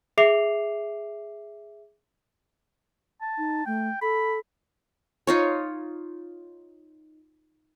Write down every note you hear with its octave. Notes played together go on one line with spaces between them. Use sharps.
G#4 E5 D6 C7 F7
A5
D#4
A3 G5
A4 B5
D#4 F4 C#5